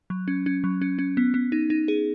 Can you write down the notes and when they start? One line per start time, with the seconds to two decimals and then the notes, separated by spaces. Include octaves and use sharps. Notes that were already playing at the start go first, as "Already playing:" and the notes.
0.10 F#3
0.28 C#4
0.46 C#4
0.64 F#3
0.82 C#4
0.99 C#4
1.17 B3
1.34 B3
1.52 D#4
1.70 D#4
1.88 G#4